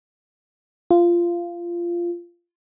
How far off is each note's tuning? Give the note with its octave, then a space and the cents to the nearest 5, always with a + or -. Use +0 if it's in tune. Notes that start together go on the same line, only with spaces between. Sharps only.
F4 -15